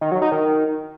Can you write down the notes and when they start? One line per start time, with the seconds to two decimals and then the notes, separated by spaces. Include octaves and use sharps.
0.01 D#3
0.12 F#3
0.22 D#4
0.32 D#3